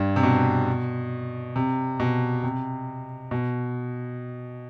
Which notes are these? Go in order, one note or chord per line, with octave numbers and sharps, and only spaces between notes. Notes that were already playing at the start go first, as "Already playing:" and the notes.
Already playing: G2
C3
B2
C3
B2
C3
B2